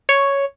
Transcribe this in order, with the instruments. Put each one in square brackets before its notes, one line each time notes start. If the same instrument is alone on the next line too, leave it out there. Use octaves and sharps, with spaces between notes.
[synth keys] C#5